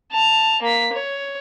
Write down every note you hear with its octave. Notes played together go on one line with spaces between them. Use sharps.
A5 F7
A#3 B6
C#5